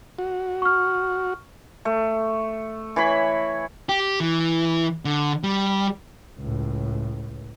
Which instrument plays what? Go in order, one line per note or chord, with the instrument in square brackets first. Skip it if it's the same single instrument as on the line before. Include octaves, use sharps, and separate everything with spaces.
[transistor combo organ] F#4
[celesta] C#6 F6
[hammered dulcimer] A3
E3 C#5 B5
[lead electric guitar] G4
E3
D3
G3
[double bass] C#2 A2